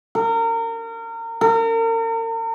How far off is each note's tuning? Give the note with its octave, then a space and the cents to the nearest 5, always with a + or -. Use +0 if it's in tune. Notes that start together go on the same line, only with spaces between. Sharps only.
A#4 -30
A#4 -40